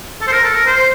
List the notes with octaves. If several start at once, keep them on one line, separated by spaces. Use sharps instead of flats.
A4
C5
A#4
A4
A#4
C5